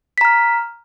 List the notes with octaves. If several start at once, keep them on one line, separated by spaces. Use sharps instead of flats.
A#5 F6 B6